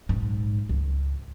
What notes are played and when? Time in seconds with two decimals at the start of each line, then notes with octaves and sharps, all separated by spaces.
0.09 A#1 G#2
0.69 C#2